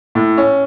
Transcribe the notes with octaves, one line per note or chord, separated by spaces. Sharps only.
A2
C#4